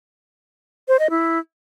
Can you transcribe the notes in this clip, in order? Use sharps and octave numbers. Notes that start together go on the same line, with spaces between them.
C5
D#5
E4